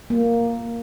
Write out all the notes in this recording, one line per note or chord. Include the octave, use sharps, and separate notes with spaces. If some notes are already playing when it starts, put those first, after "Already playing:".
A#3